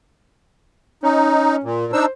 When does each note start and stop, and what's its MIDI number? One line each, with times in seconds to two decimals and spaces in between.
1.03 1.62 61
1.03 1.56 63
1.63 1.91 46
1.93 2.05 62
1.93 2.05 63
1.93 2.11 72
1.93 2.05 88